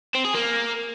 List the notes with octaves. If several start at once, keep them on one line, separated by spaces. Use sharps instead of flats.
C4
G#4
A#3